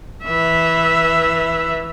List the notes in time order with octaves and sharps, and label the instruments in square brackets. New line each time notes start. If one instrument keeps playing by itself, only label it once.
[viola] E3 E5